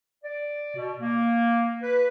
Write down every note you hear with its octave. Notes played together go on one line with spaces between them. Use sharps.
D5
B2
A#3
B4